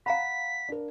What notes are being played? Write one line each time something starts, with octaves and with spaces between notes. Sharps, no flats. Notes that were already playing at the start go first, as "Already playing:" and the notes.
F5 F#5 A#5 B5 B6
D4 A#4